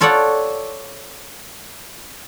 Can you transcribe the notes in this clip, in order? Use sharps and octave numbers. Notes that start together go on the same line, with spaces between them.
F4 A4 C#5 D5 F#5